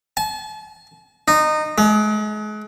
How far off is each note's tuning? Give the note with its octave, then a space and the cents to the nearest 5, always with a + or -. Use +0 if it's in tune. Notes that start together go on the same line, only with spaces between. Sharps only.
A5 -40
D#4 -20
G#3 +40